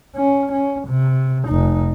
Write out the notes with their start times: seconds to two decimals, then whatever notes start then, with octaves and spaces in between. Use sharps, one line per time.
0.16 C#4
0.52 C#4
0.88 C3
1.47 F1 D#4